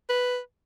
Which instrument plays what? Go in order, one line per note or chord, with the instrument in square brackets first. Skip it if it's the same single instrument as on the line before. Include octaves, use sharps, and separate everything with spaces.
[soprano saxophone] B4